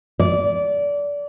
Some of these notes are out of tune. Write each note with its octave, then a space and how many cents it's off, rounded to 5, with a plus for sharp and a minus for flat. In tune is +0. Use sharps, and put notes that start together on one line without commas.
D5 -25